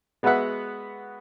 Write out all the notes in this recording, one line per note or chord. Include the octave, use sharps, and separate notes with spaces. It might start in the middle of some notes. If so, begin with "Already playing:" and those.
G#3 B3 F#4 B4 E5 F#5